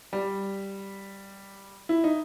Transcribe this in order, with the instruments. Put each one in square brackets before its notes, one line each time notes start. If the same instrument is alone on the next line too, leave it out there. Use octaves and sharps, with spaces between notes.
[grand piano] G3
E4
D#4